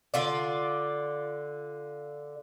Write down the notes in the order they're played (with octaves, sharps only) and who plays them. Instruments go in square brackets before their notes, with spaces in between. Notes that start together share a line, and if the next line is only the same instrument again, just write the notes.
[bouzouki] D3 F4 D5